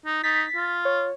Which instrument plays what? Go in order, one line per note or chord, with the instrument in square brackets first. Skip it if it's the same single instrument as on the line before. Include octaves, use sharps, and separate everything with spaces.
[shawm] D#4
[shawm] D#4 [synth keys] A6 B6
[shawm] F4
[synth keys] C#5